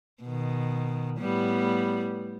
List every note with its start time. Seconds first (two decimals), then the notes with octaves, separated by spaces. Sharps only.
0.23 B2 D#3
1.20 A2 G3 B3